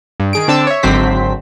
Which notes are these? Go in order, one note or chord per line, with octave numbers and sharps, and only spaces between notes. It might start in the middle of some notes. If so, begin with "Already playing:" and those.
G2
D#3 G#4 D7
D3 C4 D4 A5 D6 E6
C#5 E5
G#1 D3 F#3 C4 C5 B6